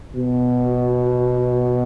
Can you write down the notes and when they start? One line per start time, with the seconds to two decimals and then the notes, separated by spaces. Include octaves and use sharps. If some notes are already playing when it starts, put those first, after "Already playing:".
0.15 B2